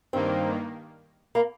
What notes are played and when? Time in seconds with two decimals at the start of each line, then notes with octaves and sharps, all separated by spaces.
0.13 G2 D#3 A#3 C4
1.35 A#3